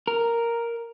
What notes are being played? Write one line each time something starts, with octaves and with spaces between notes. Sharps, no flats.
A#4